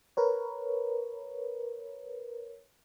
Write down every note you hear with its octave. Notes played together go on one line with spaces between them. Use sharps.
A#4 B4 C#5